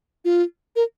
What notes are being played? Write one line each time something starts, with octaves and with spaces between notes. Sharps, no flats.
F4
A#4